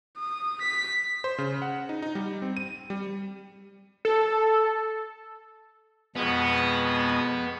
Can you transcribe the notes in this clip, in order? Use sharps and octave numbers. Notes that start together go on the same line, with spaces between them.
D#6
B6
C5
C#3
F#5
D#4
D#4
G3
C4
D#7
G3
A4
F2 B2 G#3 B3